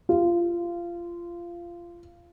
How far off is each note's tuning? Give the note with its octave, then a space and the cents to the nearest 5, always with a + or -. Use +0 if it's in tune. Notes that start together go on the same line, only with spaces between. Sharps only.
F4 -20